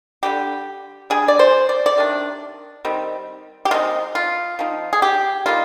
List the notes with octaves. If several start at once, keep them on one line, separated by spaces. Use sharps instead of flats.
D3 G3 A#3 D4 G4
G3 D4 G#4
D5
C5
D5
D5
C3 D#3 D4
D#3 G3 C4
G4
D#3 G#3 C4 D#4 F4
F4
F3 C4 D#4
G#4
G4
G3 A#3 D#4 F4